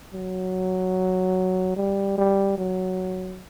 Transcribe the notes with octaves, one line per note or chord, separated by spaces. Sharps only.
F#3
G3
G3
F#3